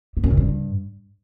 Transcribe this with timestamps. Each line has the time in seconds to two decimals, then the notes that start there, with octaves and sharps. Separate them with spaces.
0.17 B3
0.24 F#2
0.30 C#3
0.37 G2